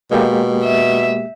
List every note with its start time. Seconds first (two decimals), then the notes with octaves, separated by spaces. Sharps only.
0.11 B2 G#3 A#3 G4
0.64 E5